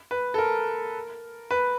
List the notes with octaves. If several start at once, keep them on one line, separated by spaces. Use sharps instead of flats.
B4
A4
A#4
B4